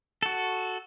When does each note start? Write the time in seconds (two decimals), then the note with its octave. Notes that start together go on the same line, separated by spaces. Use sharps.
0.23 F#4 A4